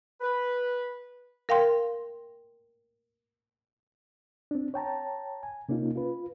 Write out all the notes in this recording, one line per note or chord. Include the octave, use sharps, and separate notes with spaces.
B4
A#4 F5 G5 C6
C4 D4
C#5 G5 A5 A#5
G#5
C3 A#3 C#4 D#4 F4
F4 B4